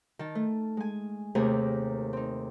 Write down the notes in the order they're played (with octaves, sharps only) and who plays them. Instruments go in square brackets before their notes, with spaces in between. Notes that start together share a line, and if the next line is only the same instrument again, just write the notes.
[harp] D#3 A5
A3
G#3 G#5
D#2 C3 A3 G#4 A#4 A#5
C4 D#4